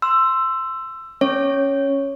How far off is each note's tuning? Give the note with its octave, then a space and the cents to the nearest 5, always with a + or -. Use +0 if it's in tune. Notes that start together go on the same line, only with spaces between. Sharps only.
C6 +0 E6 +15
C#4 -5 C#5 +0